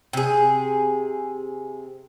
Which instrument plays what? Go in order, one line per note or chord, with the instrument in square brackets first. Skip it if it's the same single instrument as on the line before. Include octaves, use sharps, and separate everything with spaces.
[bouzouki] C3 G#4